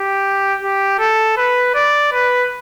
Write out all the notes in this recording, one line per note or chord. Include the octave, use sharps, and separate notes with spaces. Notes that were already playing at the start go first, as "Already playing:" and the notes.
Already playing: G4
G4
A4
B4
D5
B4